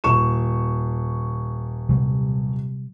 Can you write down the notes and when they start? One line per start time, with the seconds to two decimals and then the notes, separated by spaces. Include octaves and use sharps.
0.04 D#1 C#6 E7
1.89 C3 F#3 G3